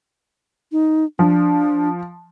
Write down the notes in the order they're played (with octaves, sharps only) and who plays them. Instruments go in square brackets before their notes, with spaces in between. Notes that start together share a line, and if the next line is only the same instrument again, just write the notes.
[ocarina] D#4
[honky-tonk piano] F3 [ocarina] D4